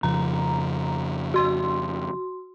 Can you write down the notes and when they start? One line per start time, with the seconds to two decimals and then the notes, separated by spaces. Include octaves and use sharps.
0.03 F2 C#3 F3 A#5
1.34 F#4 C6